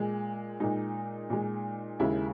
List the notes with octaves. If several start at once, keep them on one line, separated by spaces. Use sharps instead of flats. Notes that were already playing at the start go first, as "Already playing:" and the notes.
Already playing: A#2 G#3
A#2 G#3 D#4
A#2 G#3
D#2 C#3 G#3 E4